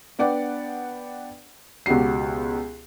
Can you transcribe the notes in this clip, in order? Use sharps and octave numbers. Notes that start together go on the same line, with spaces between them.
B3 D4 D5 F#5 G5
C#2 B2 F#4 G4 C7